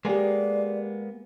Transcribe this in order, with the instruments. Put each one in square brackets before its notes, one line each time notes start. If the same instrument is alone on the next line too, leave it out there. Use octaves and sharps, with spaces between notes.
[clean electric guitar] G#3 A#3 B3 [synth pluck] G4 G#4 [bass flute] D5